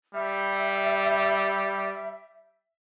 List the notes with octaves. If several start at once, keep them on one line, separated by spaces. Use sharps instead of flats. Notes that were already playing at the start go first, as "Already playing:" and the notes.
G3 E5